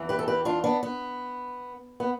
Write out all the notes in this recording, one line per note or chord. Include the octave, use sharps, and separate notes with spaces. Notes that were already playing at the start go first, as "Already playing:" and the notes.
Already playing: E2 E3
G4 B4
A4
G4 B4
D4 F4
B3 D4
B3
B3